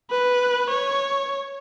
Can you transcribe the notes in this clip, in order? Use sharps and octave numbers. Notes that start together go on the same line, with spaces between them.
B4
C#5